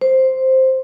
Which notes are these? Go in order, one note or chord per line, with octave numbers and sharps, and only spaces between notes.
C5